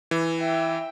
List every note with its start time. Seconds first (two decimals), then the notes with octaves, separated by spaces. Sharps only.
0.11 E3
0.40 E5 G5